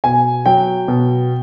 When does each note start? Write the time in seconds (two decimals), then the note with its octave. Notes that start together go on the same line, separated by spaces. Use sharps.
0.04 B2 G#5
0.46 F#3 G5
0.88 B2